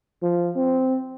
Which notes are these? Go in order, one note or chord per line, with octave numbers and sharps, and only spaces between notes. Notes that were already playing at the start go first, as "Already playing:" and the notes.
F3
C4